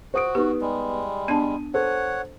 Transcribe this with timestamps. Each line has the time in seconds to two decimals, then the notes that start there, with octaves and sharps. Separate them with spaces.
0.14 F#4 C5 D#6 D7
0.35 B3 D#4 G4
0.61 G3 G#3
1.28 B3 D4 A5 D#7
1.74 A4 C5 C#5 F#5